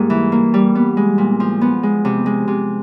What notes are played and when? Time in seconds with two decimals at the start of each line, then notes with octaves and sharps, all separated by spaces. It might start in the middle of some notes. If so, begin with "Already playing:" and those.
Already playing: G#2 G3 A#3
0.10 E3
0.32 A#3
0.54 G3
0.75 B3
0.97 G#3
1.18 A#2
1.40 F3
1.61 B3
1.83 G#3
2.05 C3
2.26 G#3
2.48 C3